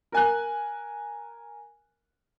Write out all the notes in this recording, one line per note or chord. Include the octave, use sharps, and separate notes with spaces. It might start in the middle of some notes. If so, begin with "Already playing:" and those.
A#4 G#5 F#6